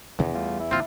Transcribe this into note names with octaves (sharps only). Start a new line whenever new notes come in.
E2 B2 D3 D#3
G3 A3 F4
E4
A#1 D#2 C4 F4